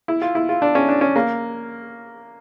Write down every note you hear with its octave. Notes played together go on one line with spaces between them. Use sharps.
E4
F4
E4
F4
D4
C#4
D4
C#4
A#3